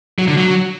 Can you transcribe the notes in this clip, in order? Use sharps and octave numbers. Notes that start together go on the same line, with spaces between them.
F#3
D3
F#3